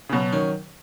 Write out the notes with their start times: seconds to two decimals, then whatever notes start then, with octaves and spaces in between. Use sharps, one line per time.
0.09 C#3
0.13 B2 F#3
0.33 D#3 C#4